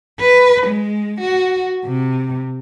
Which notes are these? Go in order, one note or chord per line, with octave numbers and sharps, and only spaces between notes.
B4
G#3
F#4
C3